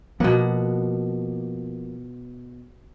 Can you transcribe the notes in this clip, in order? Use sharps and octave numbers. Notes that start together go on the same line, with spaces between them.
B2 F3 A#3 F#5